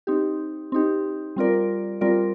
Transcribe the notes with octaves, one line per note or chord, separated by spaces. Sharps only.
C4 D#4 G4
C4 D#4 G4
G3 C4 F4 A#4 D5
G3 C4 F4 A#4 D5